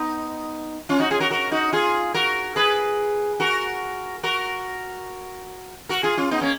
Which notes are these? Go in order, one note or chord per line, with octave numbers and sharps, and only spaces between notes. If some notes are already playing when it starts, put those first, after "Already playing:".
Already playing: B3 D#4
C#4 F4
D#4 F#4
F4 G#4
F#4 A#4
F#4 A#4
D#4 F#4
F4 G#4
F#4 A#4
G#4 B4
F#4 A#4
F#4 A#4
F#4 A#4
F4 G#4
C#4 F4
B3 D#4
A#3 C#4